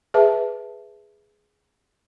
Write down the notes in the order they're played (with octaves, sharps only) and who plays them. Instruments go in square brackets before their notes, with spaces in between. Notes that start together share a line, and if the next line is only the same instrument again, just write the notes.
[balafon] G#4 B4 E5 A5